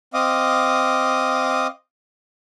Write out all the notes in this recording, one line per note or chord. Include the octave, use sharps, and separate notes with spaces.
C4 D#5 F5 D6 D#6